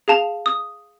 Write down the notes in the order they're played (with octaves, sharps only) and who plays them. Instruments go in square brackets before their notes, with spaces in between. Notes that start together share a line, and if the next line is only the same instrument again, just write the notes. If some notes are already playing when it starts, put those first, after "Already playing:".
[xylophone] G#4 F5 A5 F7
D#6